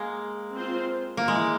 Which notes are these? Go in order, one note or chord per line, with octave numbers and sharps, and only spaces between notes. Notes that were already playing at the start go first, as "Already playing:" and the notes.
Already playing: G#3 A#3
C4 F4 C5
A#3
E3 G#3